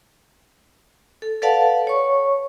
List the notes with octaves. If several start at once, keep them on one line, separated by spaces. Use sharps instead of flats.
A4
A4 B4 D5 F5 F#5 A5
C#5 C#6